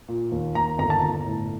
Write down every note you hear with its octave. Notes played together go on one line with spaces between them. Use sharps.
A#2
D#2
D#2 A#5
G1 A#5
A5
G1 A#5
A2